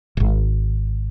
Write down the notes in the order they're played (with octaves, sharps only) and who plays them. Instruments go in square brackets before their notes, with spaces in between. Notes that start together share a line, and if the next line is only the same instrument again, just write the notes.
[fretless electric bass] D#1 G#1